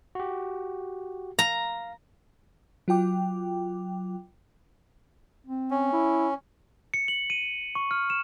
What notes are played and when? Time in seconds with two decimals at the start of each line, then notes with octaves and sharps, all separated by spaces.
0.15 F#4 G4
1.39 F5 A#5
2.88 F#3 F4 G5 D6
5.46 C4
5.71 C#4
5.93 E4
6.94 C#7
7.08 F#7
7.30 D#7
7.75 C#6
7.91 F6
8.10 E7